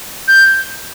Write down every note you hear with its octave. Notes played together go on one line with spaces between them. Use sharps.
G6